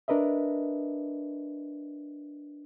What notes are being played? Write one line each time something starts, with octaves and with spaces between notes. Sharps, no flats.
D4 A#4 B4 D#5 E5